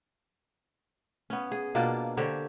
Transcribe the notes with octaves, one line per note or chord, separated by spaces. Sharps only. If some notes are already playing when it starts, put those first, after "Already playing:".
B3 C#4
G#4
B2 A#3 D4 F4
D3 G4 C5 C#5